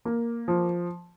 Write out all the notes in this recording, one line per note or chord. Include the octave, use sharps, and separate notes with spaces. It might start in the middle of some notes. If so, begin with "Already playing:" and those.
A#3
F3